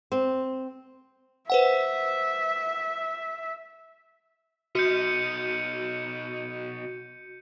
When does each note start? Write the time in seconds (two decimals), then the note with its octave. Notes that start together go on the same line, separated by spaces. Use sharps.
0.12 C4
1.50 B4 C5 E5 F#5
4.75 B2 D#4 F#4 G6 C#7 D#7